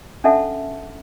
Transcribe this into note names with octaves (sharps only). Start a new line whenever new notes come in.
C#4 D4 A4 E5 F#5 A5